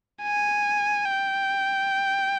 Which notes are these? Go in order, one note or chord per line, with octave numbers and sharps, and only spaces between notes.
G#5
G5